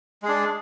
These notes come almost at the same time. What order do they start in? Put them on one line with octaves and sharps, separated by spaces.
G#3 G#4 D4